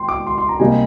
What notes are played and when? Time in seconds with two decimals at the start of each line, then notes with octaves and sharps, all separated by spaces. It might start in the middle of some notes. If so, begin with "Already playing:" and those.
Already playing: G5 C6
0.09 D6
0.27 C6
0.38 C6
0.49 A#5
0.59 C3 G3 A#3 D#4 G#5